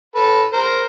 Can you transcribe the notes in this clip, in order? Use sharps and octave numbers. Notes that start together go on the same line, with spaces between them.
A4 B4
A#4 C5